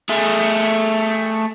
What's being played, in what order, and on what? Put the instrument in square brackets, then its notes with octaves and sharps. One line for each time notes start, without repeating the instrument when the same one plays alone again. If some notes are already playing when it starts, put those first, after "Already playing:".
[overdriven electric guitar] A3 G#4